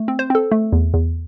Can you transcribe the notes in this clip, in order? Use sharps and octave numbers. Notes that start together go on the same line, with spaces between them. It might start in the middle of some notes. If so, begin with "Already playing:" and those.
Already playing: A3
C4
C5
C4 A4
A3
E2
E2